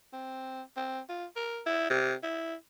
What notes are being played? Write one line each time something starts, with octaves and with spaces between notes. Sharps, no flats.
C4
C4
F4
A#4
E4
C3
E4